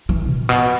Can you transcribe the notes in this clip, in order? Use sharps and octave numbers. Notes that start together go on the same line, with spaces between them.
E3
A#2
B2